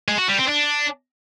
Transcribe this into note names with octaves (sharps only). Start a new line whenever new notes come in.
G#3
F#4
G3
C4
D4